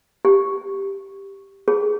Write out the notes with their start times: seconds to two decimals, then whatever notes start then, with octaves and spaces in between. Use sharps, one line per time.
0.25 G4
1.68 G#4